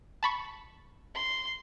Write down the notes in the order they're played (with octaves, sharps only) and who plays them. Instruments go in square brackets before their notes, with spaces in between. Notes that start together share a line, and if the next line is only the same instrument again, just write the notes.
[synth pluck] A5 B5 C#6
[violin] C6